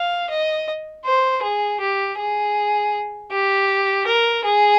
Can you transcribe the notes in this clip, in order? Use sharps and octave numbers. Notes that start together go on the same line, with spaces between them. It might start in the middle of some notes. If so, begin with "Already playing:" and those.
Already playing: F5
D#5
C5
G#4
G4
G#4
G4
A#4
G#4